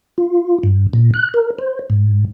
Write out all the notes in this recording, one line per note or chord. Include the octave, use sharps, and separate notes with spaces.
F4
G2
A#2
F#6
A#4
C5
G#2